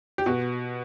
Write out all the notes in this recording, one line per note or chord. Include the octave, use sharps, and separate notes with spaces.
G4
B2 F#4